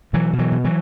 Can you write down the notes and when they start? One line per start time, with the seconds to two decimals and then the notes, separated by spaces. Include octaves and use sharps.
0.13 B2 E3 F#3
0.33 B2
0.39 E3 F#3
0.52 B2
0.64 E3 F#3